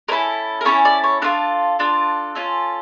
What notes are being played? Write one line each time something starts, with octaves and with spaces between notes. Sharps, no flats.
C#4 E4 A4 A#4
A#4
C#4 E4 A4 C#5
D5
C#5
D4 F4 A4 A#4
D4 F4 A4
C#4 F4 A4